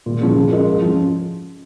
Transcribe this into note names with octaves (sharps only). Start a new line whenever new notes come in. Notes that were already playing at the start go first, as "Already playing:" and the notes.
A#2
F3 C#4 G#4
C#3
G#3 F4 A#4
G#2
F3 C#4